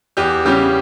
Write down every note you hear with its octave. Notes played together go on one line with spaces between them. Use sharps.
E2 G4
C#3 G3 C#4 G4